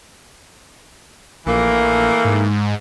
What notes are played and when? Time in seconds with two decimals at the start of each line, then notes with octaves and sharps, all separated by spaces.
1.47 A#1 E3 A3 A#3
2.25 G#2